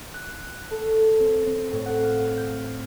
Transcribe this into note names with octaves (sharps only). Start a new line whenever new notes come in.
F#6
A4
C4
C4
A2
F#5
F4
G6